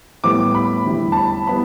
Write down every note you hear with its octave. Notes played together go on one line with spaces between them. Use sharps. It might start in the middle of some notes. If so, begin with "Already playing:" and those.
A2 E3 G3 B3 D6
D6
B5
E2 D3 G3 E4
A5
B5
G3 B3 E4 B5